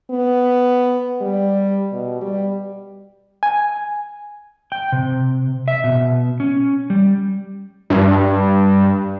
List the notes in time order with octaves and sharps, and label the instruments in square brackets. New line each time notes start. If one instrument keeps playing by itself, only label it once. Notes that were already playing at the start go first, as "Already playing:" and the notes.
[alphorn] B3
G3
B2
G3
[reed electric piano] G#5
[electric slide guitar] G5
C3
E5
B2
C#4
G3
[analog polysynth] G2